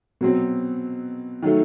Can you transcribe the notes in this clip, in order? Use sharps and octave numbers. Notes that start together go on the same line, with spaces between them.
B2 F#3 C4
D#3 F#3 A3